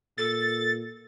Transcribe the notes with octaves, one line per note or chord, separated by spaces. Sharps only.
A#2 A4 A6